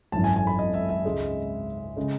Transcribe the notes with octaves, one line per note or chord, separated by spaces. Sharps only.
G#1 F#2 E3 A5
G#5
G#5
B5
D#5
E5
E5
C#2 C#3 G#3
C#3 G#3